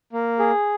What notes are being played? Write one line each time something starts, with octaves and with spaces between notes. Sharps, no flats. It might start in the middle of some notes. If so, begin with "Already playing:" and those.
A#3
G#4